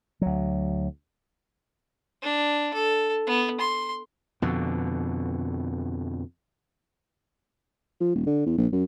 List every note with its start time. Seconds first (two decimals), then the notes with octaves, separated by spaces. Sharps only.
0.21 D2 F#3
2.22 D4
2.74 A4
3.26 B3
3.61 C6
4.42 F2 B2 D3
8.01 F3
8.15 D#1
8.26 D3
8.46 E2
8.58 A#1
8.72 F#2